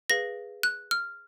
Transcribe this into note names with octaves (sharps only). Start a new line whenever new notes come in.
G#4 B4 F5 A#6
F#6
F6